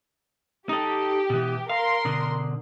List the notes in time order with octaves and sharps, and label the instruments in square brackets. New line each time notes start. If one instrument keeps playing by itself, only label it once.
[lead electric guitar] D#4 A4 [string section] G4
[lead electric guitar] B2 E3
[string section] A#4 C6 [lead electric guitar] F5
[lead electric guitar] B2 D3